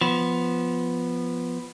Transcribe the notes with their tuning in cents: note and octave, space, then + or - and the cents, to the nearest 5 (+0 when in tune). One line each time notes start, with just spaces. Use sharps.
F3 +0 B3 +0